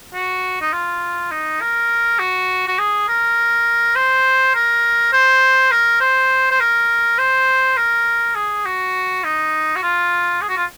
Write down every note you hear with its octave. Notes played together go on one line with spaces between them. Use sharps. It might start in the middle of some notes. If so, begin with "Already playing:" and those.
F#4
D#4
F4
D#4
A#4
F#4
F#4
G#4
A#4
C5
A#4
C5
A#4
C5
C5
A#4
C5
A#4
G#4
F#4
D#4
F#4
F4
G#4
F#4
F4